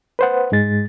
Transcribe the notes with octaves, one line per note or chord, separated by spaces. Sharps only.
B4 C5 F#5
G#2 G#3 A6